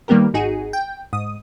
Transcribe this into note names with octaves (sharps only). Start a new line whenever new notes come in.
D#3 G3 A#3 B3 G4 A#4
G#1 D#4 F#4 G#4
G5
G#2 D#6